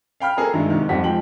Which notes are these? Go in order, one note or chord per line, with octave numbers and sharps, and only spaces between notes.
F5 G5 B5 F6
A#3 G#4 A4 A#5
G2 D#3 G#3 E4
G#2 C3 D#3
F2 G3 F#5 B6
F3 G#3 G5 F#7